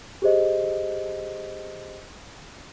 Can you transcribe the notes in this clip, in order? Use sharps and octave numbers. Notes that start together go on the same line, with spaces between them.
G4 G#4 C5 D#5